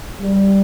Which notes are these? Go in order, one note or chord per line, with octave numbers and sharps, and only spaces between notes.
G3